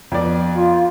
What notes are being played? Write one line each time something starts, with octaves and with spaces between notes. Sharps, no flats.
F2 B3 D5
F4